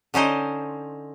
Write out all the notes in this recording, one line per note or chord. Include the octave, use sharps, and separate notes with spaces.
D3 C#4 D#4 C5